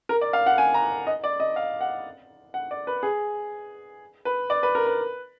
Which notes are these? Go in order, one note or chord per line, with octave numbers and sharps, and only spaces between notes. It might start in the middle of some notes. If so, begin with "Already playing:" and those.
A#4
D5
F5
F#5
G#5
A#5
D#5
D5
D#5
F5
F#5
F#5
D5
B4
G#4
B4
D5
B4
A#4
B4